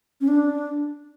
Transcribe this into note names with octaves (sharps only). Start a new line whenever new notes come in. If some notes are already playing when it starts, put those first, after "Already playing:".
C#4
D4